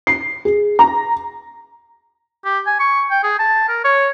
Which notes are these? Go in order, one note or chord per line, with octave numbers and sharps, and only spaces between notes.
C7
G#4
A#5
G4
G#5
C#6
G5
G#4
A5
A#4
C#5